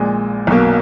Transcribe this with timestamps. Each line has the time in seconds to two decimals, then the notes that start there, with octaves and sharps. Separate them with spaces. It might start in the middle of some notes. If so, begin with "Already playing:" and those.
Already playing: A#1 A#2 G#3
0.47 B1 B2 A#3